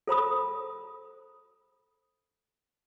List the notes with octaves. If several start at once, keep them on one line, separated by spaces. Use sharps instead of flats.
A4 C5 B5 D#6